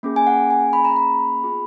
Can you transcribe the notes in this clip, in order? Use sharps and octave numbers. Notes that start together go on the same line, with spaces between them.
A#3 C#4 G#4
G#5
F#5
G#5
B5
A#5
B5
B3 F4 G#4